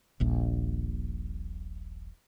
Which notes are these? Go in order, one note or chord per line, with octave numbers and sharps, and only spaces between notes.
D#1 A#1